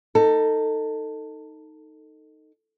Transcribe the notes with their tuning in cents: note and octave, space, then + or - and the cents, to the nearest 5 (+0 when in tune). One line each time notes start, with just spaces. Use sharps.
D#4 +0 A4 +20